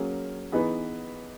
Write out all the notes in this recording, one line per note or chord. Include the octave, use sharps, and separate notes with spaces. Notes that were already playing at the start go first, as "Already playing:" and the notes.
Already playing: F#3 A#3 C#4 G#4
E3 B3 D#4 G#4 B4